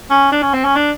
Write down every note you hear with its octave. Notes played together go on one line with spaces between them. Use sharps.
C#4
D4
C#4
C4
C#4
D4